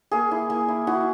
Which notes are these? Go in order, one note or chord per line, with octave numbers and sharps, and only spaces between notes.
A#3 G#4
E4
A#3
E4
E4 F#4